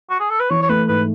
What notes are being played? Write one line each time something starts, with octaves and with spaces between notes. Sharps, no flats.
F#4
G#4
A4
B4
E3 C#5
C#5
A3 B4
G#2 B4